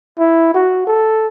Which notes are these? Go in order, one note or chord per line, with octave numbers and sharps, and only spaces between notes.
E4
F#4
A4